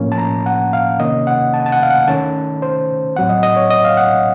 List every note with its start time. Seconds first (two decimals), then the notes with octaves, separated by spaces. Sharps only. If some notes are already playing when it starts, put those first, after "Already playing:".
Already playing: A2 F3 A#3 C#4
0.12 A5
0.18 A#5
0.46 F#5
0.73 F5
0.99 C3 D#3 A#3 C#4 D#5
1.27 F#5
1.54 A5
1.66 A5
1.72 F#5
1.83 F5
1.91 F#5
2.08 D#3 A3 C#4 A5
2.62 C5
3.16 A2 F#3 C4 F#5
3.29 D#5
3.43 D#5
3.56 C#5
3.70 D#5
3.85 F5
3.97 F#5